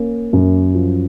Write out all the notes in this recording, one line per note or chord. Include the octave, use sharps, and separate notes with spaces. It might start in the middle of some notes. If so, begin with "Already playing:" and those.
Already playing: A#3 C#4
F#2
F3